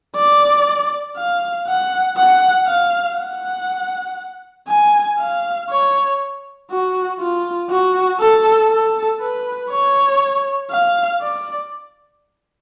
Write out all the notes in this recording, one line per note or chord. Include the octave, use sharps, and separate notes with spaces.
D5
F5
F#5
F#5
F5
F#5
G#5
F5
C#5
F#4
F4
F#4
A4
A4
B4
C#5
F5
D5